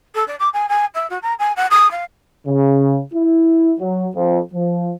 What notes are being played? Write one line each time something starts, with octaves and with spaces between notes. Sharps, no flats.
A4
D5
D6
G#5
G#5
E5
F#4
A#5
G#5
F#5
D#6
F5
C#3
E4
F#3
F2
F3